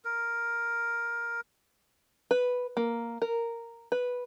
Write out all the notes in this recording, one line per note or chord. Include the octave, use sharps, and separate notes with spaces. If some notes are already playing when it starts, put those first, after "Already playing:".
A#4
B4
A#3
A#4
B4